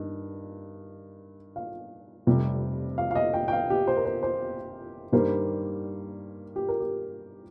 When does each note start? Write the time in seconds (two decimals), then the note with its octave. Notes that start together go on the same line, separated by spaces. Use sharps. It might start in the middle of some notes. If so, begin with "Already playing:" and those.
Already playing: G2 D#3 D#5
1.56 F5
2.27 F1 F2 C3 G3
2.98 F5
3.11 F5
3.15 D#5
3.34 G5
3.48 G5
3.52 F5
3.70 G4
3.87 C5
3.97 A#4
4.05 C5
4.23 C5
5.12 G2 D#3 G3 A#3 C5
6.56 G4
6.68 A#4
6.80 G4